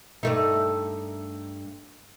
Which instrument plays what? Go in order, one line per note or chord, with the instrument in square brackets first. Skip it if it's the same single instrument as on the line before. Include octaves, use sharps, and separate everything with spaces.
[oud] G2 A3 D#4